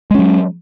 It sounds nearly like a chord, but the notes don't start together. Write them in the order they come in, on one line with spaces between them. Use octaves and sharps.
G#3 C#4 F#3